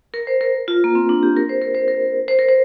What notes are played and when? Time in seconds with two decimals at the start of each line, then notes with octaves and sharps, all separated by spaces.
0.14 A#4
0.27 C5
0.41 A#4
0.68 F4
0.84 A#3
0.95 C4
1.09 D4
1.23 G4
1.37 A#4
1.49 C5
1.62 A#4
1.75 C5
1.88 A#4
2.28 C5
2.39 A#4
2.49 C5